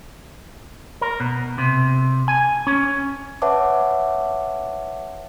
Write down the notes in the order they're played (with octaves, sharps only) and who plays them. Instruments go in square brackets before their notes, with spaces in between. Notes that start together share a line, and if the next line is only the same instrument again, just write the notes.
[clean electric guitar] A#4
B2
C3
G#5
C#4
[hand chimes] B4 C#5 E5 F#5 A5 D6